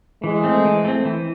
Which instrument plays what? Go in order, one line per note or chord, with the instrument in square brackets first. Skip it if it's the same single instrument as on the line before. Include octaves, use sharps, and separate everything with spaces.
[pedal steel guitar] E3 [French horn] G#3
[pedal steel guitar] A3 C4
E3
A3 C4
E3